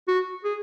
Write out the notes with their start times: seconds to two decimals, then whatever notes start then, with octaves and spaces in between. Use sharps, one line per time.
0.08 F#4
0.44 G#4